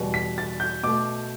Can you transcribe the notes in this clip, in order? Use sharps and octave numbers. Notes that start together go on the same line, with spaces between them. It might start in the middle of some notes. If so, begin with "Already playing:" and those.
Already playing: E2 B2 G3
B6
A6
G6
B2 A3 D6